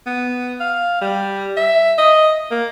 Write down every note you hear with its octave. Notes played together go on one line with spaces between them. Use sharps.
B3
F5
G3
E5
D#5
A#3